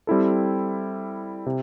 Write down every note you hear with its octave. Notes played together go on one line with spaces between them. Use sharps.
G3 C4 E4 A4
C3